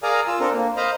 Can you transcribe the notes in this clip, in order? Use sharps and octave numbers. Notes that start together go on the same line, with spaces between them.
G#4 A#4 D5 F5 G#5 A#5
F4 E6
C4 D4 A4 A#4
A#3
C5 D#5 F5 A#5 B5